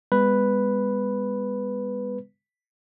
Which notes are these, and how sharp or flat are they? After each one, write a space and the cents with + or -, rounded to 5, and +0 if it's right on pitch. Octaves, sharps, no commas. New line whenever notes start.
G#3 -45 B3 +0 B4 +0